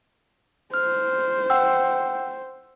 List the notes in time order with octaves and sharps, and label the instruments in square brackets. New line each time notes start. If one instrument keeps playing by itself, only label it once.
[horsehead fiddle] C5 [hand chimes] F6
[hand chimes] F#5 G5 E6